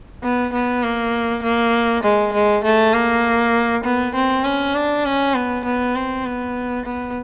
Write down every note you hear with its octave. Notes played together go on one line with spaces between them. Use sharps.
B3
B3
A#3
A#3
G#3
G#3
A3
A#3
B3
C4
C#4
D4
C#4
B3
B3
C4
B3
B3